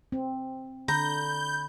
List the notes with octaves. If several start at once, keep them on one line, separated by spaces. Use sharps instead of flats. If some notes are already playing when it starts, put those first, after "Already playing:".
C4
D3 A#5 B5 G6